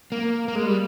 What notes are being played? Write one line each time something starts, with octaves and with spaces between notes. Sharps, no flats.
A#3
A#3
G#3
G3